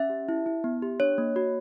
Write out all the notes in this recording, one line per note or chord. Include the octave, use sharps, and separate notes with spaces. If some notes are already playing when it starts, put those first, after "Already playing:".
Already playing: C#4 E5
G4
E4
E4
B3
G4
D4 C#5
A#3
F#4